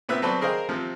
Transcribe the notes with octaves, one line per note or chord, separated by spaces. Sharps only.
A#2 B3 C4 E5 F#6
F#3 C4 A4 B4 C5 D5
G#4 A#4 C5 D#5 F5 G5
C3 F3 C4